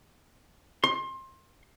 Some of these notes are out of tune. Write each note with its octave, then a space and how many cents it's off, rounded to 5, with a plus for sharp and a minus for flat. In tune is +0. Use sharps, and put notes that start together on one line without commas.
C6 +25